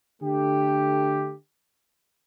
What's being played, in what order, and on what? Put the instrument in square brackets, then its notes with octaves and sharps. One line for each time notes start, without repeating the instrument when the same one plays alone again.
[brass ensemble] D3 A3 D4 G4